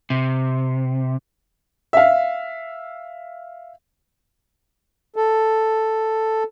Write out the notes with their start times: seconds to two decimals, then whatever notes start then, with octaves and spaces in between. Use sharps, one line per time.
0.10 C3
1.93 E5 F5
5.16 A4